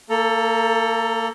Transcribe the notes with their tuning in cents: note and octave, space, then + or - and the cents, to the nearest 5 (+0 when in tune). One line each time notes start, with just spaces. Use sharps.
A#3 -30 A4 +10 A#5 +0